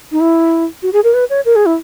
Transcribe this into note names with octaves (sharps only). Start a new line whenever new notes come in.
D#4
E4
F#4
G#4
A#4
B4
C#5
A#4
G#4
E4